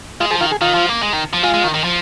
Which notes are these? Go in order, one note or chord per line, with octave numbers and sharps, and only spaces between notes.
G#3 F4
F3 G#4
D#3 F4
G#4
D#3 F4
F3
A#3
G#3
D#3
F3
G#3 F4
G#3
D#3
D#3
F3